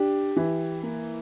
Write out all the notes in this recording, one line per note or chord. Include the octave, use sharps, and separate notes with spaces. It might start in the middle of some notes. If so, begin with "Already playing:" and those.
Already playing: D4 G4
E3
A#3